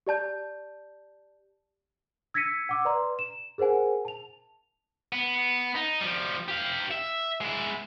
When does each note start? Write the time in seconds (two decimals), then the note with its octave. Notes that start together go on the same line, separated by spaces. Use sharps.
0.07 G4 D5 A5 G6
2.34 E6 G#6 A#6 B6 C#7 D#7
2.69 F#5 D6 E6
2.85 B4 D5 A#5 C6
3.19 E7
3.58 G#4 A#4 C5 F#5 G#5
4.05 A5 F7
5.12 B3
5.75 D#4
6.00 F3 G3
6.48 G4 F5
6.91 E5
7.41 G#3 E4